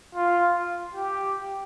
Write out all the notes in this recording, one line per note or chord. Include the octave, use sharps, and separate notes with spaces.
F4
G4